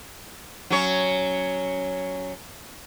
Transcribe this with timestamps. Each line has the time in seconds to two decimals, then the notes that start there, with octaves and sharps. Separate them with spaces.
0.70 F#3 C#4 C#5